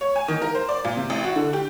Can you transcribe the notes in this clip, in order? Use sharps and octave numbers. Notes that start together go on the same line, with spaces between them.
C#5
G#5
D#3
A#4
C5
D5
A#2
C3
A1
F#4
D3
G4